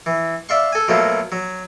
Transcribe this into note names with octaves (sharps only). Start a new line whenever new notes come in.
E3
D5 E5 F5 C6 C#6
A4 G#5
B2 F#3 A3 A#3 F4
F#3